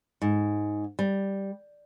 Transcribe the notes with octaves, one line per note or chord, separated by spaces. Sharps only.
G#2
G3